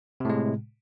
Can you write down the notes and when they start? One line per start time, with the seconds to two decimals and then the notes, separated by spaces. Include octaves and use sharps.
0.20 C3
0.25 A2
0.30 G#3